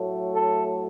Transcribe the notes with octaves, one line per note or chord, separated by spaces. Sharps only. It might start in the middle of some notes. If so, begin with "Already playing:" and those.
Already playing: A2 F#3 A3
A4